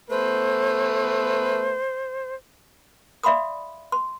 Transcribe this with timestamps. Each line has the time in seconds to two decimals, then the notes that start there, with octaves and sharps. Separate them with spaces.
0.10 A3 B3 B4 C5
3.23 D5 E5 F5 B5 C6 D#6
3.92 C6